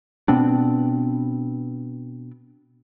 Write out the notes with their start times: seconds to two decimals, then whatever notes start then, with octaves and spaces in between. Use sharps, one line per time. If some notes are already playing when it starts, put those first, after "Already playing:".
0.28 B2 B3 C4 D4